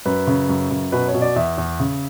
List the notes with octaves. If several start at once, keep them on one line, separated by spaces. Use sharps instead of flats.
F#2 B4
C#3
F#2
F#2
B2 B4
C#5
B2
D5
E2 E5
E2
C#3